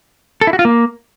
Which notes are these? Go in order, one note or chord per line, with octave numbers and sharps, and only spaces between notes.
A4
E4
F#4
F4
A#3